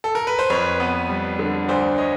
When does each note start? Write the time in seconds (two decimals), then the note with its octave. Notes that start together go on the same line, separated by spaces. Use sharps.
0.04 A4
0.15 A#4
0.27 B4
0.39 C5
0.50 F2 B4 C#5
0.80 B3
1.09 G3
1.39 D3
1.68 D2 C5 D5
1.98 C#5 D#5